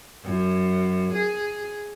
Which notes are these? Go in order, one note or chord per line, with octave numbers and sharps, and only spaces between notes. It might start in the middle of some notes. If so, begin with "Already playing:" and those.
F#2
G#4